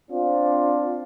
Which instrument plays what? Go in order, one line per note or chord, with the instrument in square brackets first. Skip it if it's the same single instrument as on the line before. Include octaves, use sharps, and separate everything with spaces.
[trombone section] C4 D4 F4